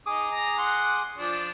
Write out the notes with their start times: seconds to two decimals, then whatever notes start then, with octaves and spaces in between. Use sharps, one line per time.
0.06 D#4 G#4 D6 D#6
0.31 A#5
0.58 F#5 C6
1.18 F3 D4